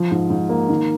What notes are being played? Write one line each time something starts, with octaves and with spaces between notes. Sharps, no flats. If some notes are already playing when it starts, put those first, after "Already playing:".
Already playing: F3
G#2
G#2
A#3
D#3